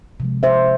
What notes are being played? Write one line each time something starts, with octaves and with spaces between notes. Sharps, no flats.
C3 F3 G#3
C5 E5